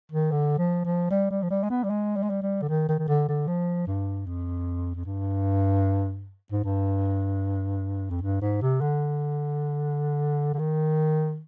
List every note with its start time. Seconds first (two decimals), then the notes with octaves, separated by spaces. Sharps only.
0.12 D#3
0.31 D3
0.58 F3
0.85 F3
1.10 G3
1.30 G3
1.42 F3
1.50 G3
1.63 G#3
1.70 B3
1.83 G3
1.90 G#3
2.16 G3
2.23 G#3
2.30 G3
2.42 G3
2.62 D3
2.69 D#3
2.89 D#3
2.99 D#3
3.08 D3
3.28 D3
3.47 F3
3.87 G2
4.26 F2
4.95 F2
5.05 G2
6.52 G#2
6.64 G2
8.10 F2
8.22 G2
8.41 G#2
8.62 C3
8.81 D3
10.54 D3
10.59 D#3